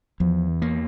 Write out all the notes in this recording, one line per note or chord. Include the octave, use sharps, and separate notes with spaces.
E2 F3
E3
A#3